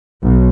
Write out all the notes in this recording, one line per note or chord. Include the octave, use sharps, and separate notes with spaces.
B1